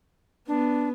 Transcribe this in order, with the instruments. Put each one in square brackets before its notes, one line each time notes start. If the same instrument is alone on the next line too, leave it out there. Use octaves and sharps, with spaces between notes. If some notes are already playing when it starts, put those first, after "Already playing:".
[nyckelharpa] B3 [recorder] D4